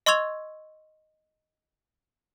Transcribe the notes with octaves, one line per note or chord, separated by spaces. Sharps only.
D#5 C6 C#6 E6 G#6 F7